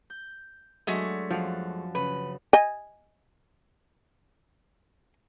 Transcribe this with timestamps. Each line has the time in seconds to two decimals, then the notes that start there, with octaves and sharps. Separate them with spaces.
0.10 G6
0.87 F#3 G#3 A3 D4 F#4
1.31 F#2 F3 F5 F#5
1.95 C#3 C#4 B4
2.53 D#5 G#5